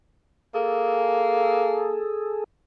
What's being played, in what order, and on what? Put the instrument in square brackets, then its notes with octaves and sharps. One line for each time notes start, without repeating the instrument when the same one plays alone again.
[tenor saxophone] A#3 [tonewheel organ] G#4 A4